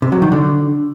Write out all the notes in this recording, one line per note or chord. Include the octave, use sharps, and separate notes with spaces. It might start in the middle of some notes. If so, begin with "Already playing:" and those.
C3
F#3
D#3
D3